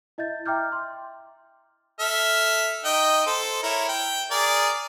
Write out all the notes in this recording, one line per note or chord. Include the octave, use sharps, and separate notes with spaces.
E4 D#5 E5 G6 A6
E5 G5 A#5 D6 F6 G6
C6
A4 E5 F6
D#4 D#5 G5
A4 C5
E4 A#4 C#5
G5
G#4 A#4 D5